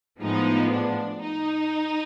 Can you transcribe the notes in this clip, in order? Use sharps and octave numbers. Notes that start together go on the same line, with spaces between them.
A2 F3 G#3 B3 D#4
D4
D#4